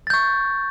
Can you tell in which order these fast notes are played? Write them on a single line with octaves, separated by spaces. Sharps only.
A6 G6 C#6